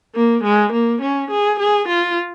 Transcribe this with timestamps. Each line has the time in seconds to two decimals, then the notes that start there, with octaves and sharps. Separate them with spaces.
0.15 A#3
0.44 G#3
0.73 A#3
1.02 C#4
1.31 G#4
1.60 G#4
1.88 F4